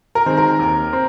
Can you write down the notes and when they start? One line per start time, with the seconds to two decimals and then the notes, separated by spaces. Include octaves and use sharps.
0.15 A#4
0.26 D#3 G#3 C4
0.37 A#4
0.59 D#2
0.93 C4